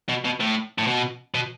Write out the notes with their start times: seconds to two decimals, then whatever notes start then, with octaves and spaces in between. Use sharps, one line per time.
0.09 B2
0.25 B2
0.41 A2
0.78 A2
0.87 B2
1.34 B2